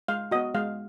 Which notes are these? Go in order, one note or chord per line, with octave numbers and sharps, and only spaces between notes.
G#3 F5
B3 F#4 D#5
G#3 F5